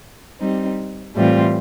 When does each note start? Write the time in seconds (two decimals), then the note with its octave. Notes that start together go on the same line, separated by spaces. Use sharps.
0.40 G3 C4 D#4
1.14 A2 E3 G3 C4 F4